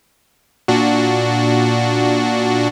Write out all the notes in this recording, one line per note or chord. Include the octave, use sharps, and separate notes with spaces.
A#2 D4 F#4